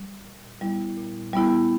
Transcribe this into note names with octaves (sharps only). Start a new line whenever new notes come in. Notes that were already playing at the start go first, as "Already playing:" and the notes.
Already playing: G3
A#2
G3 B3 E4
A#2
G3 B3 E4